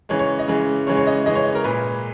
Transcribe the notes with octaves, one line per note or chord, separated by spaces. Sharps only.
C#3 E3 G#3 C#5
C#5
D#5
C#3 E3 G#3
C#3 E3 G#3 C#5
C#5
D#5
C#3 E3 G#3 D#5
C#5
A#4
A#2 G#3 B4